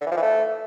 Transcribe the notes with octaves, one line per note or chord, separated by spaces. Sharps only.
D3
E3
F3
E3
A3